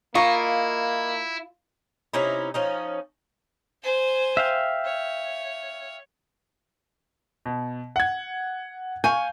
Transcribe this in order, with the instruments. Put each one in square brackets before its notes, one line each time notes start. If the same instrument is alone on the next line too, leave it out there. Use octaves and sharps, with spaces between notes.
[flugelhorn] A#3 [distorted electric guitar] E4 [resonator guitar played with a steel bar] F4 [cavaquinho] D#5 A#5 C#6
[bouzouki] C3 C#4 D#4 E4
F3 C#4 D#4
[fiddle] C5 G#5
[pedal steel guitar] E5 F5 G5
[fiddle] C#5
[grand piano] B2
F#5 G#6
[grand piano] F5 C#6 G6 [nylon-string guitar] G#5